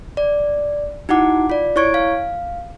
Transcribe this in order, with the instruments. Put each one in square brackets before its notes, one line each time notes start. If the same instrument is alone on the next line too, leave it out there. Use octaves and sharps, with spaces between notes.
[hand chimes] D5
D#4 E4 F#4 F#5 D6
F4 D5
E4 C#5 C#6 G#6 D7
F5